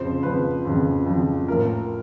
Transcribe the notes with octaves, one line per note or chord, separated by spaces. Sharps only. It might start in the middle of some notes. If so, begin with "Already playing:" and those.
Already playing: F2 C#3 F3 C5
F2 C#3 F3 B4
F2 C#3 F3
F2 C#3 F3
A2 F3 A#4